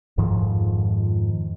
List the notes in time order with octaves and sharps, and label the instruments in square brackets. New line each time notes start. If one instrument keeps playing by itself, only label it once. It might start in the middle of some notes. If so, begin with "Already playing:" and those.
[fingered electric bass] F2 G#2 D#3 F3